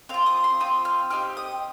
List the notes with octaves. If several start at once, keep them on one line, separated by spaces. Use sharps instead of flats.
C4 F4 F5
D#6
C6
C4 F4 D#6
F6
C4 D#4 G4 F6
D#6